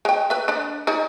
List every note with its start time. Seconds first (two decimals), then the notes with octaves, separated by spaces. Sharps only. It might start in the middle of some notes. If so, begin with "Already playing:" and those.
0.05 G#3 G5
0.30 B4 E5
0.48 D4 D5
0.87 D#4 G#4 D5